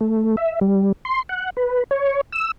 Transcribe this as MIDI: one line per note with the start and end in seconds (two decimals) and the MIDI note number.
0.01 0.36 57
0.37 0.59 76
0.61 0.92 55
1.05 1.22 84
1.29 1.50 78
1.57 1.84 71
1.91 2.21 73
2.33 2.51 88